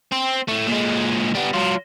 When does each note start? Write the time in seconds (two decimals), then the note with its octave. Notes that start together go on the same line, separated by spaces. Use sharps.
0.12 C4
0.48 A2 A3
0.67 A#2 G#3
1.35 G3 B3
1.54 F#3 F4